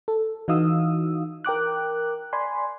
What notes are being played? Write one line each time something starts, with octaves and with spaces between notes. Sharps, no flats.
A4
E3 D#4 F#4 F5 D#6 E6
A#4 G5 D6 F#6
D5 G#5 B5 C6